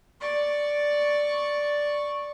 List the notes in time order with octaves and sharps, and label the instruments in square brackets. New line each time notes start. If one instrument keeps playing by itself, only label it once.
[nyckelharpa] D5 C#6